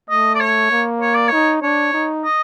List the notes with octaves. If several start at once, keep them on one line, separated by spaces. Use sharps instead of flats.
A3 D#5
D5
C#5
A#3
C#5
D5
D#4 C#5
D4 C#5
D#4
D#5